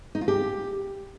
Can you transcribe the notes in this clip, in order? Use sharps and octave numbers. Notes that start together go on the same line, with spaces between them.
D#4
F4
G4